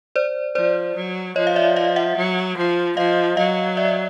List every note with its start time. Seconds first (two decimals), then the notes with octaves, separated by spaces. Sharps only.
0.16 C5 D5
0.55 F3 C5 D5
0.96 F#3
1.36 F3 C#5 D#5
1.47 F5
1.56 D5 E5
1.76 D#5 F5
1.96 E5 F#5
2.17 F#3
2.57 F3
2.97 F3 D#5 F5
3.37 F#3 D#5 F5
3.77 D5 E5